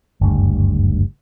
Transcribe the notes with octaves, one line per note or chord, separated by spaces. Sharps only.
F#1 D2 G2